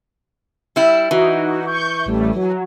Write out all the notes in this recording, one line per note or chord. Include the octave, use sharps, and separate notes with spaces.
G3 E4 E6
E3 D#4 F#4
C#6 G6
A1 G3 A3
F#3